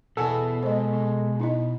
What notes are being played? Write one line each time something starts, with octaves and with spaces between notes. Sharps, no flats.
E2 B2 A4 F#5 G#5 A5
G#3 C5 D#5
D#4 E4 D#5